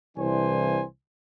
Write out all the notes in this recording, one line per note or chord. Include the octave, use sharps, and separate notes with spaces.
C2 E3 D4 C5 G#5